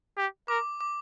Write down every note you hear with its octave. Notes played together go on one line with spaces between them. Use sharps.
G4
A#4 D6
D6